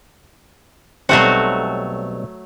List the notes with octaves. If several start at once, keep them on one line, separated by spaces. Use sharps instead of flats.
B1 F#3 G3 A3 C4 F#4